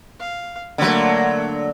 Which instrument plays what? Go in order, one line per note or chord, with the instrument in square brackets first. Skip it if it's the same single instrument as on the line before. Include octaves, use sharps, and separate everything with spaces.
[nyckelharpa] F5
[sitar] D3 F#3 [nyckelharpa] A3 A#3